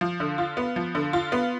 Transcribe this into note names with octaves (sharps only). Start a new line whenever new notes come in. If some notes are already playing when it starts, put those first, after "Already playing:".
F3
D3
F4
B3
F3
D3
F4
B3